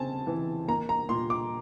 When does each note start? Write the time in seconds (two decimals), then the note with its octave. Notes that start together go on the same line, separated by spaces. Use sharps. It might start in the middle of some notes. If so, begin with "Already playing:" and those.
Already playing: C#3 C4 G#5 A5
0.27 E3
0.68 A#3 A#5
0.89 A#5
1.09 A#2 C6
1.30 D6